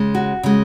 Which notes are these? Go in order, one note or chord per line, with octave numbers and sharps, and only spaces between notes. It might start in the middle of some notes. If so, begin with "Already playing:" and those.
Already playing: C#3 G#3
F#4
C#3 G#3